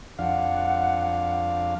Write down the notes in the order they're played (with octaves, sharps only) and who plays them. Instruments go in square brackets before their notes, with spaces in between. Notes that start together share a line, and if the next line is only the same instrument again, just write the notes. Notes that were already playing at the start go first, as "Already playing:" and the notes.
[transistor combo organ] F2 D4 F5 [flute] F#5